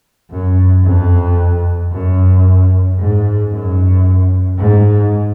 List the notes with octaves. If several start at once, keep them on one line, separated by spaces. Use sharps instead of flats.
F#2
F2
F#2
G#2
F#2
G#2